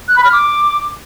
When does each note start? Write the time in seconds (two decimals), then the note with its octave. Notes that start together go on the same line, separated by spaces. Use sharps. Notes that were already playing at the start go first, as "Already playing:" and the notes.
0.08 F#6
0.16 B5
0.24 F6
0.33 D6